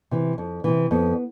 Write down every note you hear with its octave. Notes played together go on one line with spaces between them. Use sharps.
C3 E3
F2
C3 E3
F2 B3